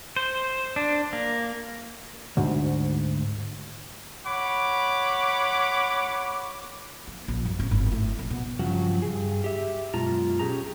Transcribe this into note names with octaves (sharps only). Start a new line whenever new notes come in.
C5
D4
A#3
D2 G#2
C#5 F#5 B5 D6
A#3
A#1
F#2
G#1
G1
A2
A#2
B2
G2 C#3 F3 F#3 F#4
G2 G#4
G4 E5
F#2 B2 G#3 F4 A5 A#5
C#4 G4 G#4 A#5